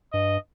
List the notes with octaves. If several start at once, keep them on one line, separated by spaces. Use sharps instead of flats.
G2 D#5